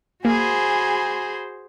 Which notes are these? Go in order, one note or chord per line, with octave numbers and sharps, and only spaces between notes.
A#3 F#4 G#4 C5 G#5 B5